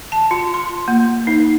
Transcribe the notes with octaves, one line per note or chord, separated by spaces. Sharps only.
A5
F4
C6
A#3
D#4